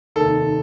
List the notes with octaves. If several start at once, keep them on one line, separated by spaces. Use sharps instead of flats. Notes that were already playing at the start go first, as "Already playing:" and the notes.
F1 D#2 D#3 A4